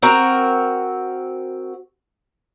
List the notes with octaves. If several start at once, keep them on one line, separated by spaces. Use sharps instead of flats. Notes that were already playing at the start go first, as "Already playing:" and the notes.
C4 F#4 A#4